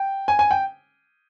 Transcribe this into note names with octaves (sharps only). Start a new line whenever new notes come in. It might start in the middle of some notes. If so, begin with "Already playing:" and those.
Already playing: G5
G#5
G#5
G5